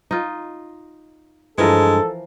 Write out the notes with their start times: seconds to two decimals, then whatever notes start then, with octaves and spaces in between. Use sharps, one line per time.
0.11 D#4 F4
1.58 G2 E3 F3 G#3 A4 A#4